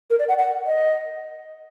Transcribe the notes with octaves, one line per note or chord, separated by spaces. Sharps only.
A#4
D5
F#5
F#5
D#5